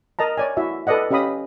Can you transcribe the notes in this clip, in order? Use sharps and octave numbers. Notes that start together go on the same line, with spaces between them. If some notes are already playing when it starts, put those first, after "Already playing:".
A#4 D#5 A5 A#5
C#5 D5 G#5
E4 F#4 E5
A4 B4 D5 D#5 F#5
C#4 G4 D#5 F5 B5 D#6